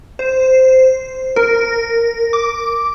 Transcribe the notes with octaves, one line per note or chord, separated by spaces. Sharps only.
C5
A#4
D6